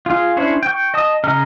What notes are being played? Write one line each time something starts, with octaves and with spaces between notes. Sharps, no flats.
F4 G#4 F5
C#4 D4 E4 C5 C#5
G5 C#6
D#5 A5 D#6
C#3 D#5 A#5 F6